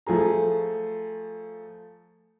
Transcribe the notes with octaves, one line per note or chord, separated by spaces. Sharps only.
F3 A3 G#4 A#5